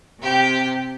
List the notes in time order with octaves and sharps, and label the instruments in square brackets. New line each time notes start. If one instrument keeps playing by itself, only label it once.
[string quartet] C3 G4